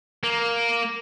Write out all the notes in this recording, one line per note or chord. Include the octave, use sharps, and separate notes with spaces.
A#3